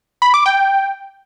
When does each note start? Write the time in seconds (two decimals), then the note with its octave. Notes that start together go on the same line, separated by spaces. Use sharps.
0.22 B5
0.34 D6
0.46 G5